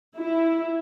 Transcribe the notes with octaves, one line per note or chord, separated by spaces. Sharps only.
E4